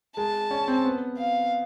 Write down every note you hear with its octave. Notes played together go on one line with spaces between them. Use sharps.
G#3 A5
C#4
C4
B3
F5